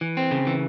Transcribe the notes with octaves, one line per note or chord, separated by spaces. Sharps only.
E3
C4
C#3
E3